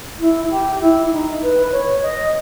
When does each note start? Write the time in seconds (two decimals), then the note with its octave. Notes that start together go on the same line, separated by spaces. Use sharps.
0.19 E4
0.50 G4
0.80 E4
1.11 D#4
1.42 B4
1.72 C#5
2.02 D#5